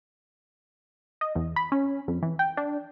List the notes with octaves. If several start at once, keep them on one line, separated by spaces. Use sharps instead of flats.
D#5
E2
B5
C#4
F2
E3
G5
D4